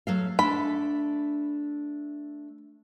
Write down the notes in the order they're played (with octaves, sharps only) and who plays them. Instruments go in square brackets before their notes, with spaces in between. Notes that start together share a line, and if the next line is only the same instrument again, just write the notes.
[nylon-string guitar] F#3 A3 F5
[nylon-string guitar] A3 D4 [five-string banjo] B5